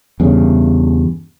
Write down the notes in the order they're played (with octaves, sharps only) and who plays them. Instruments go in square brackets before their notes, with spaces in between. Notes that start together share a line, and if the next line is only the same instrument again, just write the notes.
[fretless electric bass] E2 G2 C#3